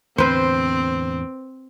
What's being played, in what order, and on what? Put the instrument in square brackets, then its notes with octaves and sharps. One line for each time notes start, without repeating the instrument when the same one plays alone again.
[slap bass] E2 A2 D3 [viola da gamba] C4 [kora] B4 C5